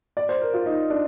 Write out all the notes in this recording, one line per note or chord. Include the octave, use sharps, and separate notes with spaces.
D5
C5
A#4
F4
D#4
D4